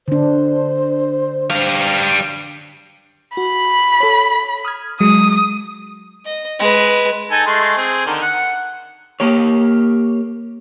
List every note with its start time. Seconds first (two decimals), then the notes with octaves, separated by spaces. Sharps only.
0.08 D3 D4 C5
1.50 G3 F5
3.37 F#4 B5
4.00 A4 C#5
4.65 D#6 F6 G#6
5.00 F#3 G#3 D#6
6.26 D#5
6.59 G#3 B4
7.31 D#4 A4 G#5
7.46 G#3 A3 C6
7.77 C4 G#4
8.06 D3 D#3
8.22 F#5
9.20 A#3 G4 C#5